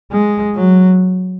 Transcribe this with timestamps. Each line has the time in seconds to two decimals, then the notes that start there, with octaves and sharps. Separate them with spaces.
0.12 G#3
0.55 F#3